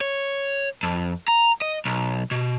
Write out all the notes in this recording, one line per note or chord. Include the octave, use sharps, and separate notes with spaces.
C#5
F2
A#5
D#5
B1
B2